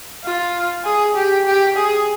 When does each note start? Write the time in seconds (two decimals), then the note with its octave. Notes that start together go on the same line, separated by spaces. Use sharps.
0.24 F4
0.84 G#4
1.15 G4
1.46 G4
1.77 G#4